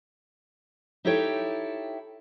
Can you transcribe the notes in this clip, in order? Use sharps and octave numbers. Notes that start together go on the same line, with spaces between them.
D#4 E4 G4 A4 C#5 G5